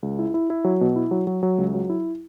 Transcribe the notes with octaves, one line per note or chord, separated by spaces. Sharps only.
C#2
E4
E4
E4
F#3
B2
E4
F#3
F#3
F#3
C#2
F#3
E4